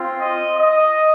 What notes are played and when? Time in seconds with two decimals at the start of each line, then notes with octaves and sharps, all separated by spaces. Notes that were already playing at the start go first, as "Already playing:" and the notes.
Already playing: C4 F4
0.19 D#5
0.59 D#5